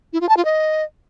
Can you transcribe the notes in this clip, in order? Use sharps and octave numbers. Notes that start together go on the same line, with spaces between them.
E4
F4
A5
F4
D#5